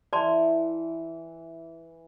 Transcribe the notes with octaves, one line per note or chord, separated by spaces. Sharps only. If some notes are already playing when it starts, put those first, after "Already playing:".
E3 D5 A5 C6